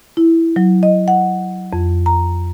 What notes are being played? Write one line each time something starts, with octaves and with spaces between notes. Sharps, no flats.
E4
F#3
D#5
F#5
F2
A#5